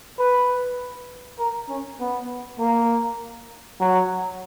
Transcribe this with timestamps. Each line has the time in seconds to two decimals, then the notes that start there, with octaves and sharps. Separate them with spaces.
0.19 B4
1.39 A#4
1.69 C#4
2.00 B3
2.59 A#3
3.80 F#3